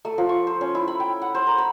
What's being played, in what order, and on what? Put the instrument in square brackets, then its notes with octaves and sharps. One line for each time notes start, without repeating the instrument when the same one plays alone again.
[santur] A3
F3
C#6
C5
C#4
E4
B5
G5
F#5
C5
A#4
B5